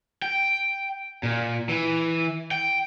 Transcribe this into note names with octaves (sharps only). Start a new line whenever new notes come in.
G5
A#2
E3
G5